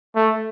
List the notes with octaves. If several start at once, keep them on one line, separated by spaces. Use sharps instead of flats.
A3